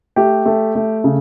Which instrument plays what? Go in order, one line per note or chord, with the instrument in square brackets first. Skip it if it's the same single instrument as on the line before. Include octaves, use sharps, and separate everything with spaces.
[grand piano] A3 G4
A3
A3
C#3